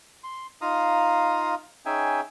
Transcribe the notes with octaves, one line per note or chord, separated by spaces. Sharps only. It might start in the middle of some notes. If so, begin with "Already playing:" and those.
C6
D#4 F4 F5 A#5 D#6
C#4 D#4 G#4 E5 G5 G#5